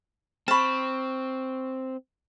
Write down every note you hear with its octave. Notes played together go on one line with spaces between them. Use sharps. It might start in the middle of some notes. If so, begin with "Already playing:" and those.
C4 A5 B5 C#6 F6